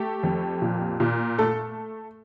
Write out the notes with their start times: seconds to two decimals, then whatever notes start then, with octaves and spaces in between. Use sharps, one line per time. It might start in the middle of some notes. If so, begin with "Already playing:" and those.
Already playing: A3 G4
0.23 F2
0.62 A#2
1.00 A#2
1.39 A3 A4